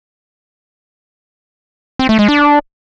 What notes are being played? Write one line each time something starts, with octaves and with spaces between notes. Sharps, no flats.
C4
A3
G#3
D4